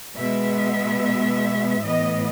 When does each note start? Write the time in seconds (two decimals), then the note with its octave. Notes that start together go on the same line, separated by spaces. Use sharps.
0.16 B2 G#3 B3 E5
1.83 A2 E3 B3 D#5